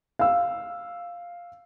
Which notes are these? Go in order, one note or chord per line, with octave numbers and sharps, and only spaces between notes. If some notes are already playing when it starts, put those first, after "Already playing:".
F5 E6